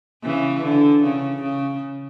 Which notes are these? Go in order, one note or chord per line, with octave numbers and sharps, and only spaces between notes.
C#3 E3
D3
C#3
C#3